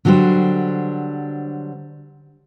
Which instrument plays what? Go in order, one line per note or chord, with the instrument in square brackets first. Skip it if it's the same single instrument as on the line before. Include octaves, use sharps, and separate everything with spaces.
[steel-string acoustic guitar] D3 F#3 G3 D4 C5